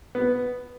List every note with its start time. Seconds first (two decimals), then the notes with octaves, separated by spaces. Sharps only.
0.15 B3